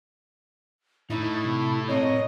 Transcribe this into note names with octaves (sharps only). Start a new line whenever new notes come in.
A2 D#4 E4
C3
C4 A#4 C#5 D#5